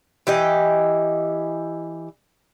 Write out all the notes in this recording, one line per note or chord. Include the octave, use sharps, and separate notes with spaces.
E3 G4 D#5